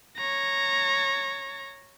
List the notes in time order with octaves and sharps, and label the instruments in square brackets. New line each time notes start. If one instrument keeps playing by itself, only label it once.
[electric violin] C#5 A#5